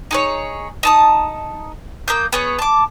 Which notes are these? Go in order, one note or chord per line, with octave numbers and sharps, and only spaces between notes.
D#4 G#4 C#5
D#4 A5 D#6
A#3 D#6 G6
B3 G#4 C#5
A5 D6